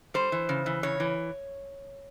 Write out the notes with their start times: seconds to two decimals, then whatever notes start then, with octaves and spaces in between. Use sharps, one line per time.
0.14 G3 C5
0.32 E3
0.49 C#3
0.66 E3
0.83 C#3 C#5
1.00 E3